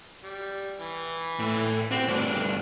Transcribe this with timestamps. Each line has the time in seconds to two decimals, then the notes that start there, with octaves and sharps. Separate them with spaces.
0.24 G3
0.77 E3
1.39 A2
1.91 C4 F#4 G4
2.08 D2 G2 D4